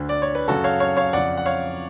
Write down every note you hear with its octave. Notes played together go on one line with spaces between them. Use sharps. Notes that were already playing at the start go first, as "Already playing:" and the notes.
Already playing: D2 D3
D5
C#5
B4
F#2 C#3 F#4 A4
C#5 F5
C#5 F5
C#5 F5
F2 C#3 D5 F#5
F#5
C#5 F5